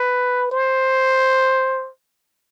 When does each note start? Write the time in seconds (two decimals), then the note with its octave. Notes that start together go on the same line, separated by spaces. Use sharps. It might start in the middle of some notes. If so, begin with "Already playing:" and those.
Already playing: B4
0.52 C5